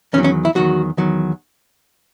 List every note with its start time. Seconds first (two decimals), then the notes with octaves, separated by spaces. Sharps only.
0.13 E2 D#3 F#3 C#4
0.24 C#4
0.45 E4
0.55 E2 D#3 F#3 F#4
0.97 E2 D#3 F#3